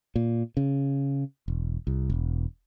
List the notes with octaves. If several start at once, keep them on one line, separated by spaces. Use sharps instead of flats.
A#2
C#3
E1
C2
E1